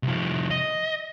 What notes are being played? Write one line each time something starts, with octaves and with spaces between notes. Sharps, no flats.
C2 F3
D#5